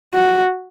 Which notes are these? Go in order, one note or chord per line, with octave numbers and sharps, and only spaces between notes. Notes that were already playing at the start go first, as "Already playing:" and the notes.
F#4